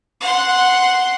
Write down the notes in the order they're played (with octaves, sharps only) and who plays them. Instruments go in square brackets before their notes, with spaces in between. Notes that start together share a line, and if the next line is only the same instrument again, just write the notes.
[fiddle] F#5 C6